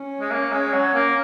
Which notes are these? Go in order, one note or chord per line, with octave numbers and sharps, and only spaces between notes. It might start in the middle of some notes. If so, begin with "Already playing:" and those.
Already playing: C#4
G#3
A#3
G#3
F#3
A#3